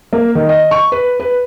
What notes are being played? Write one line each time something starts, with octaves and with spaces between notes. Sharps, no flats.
A#3
D#3
D#5
C#6
B4
B4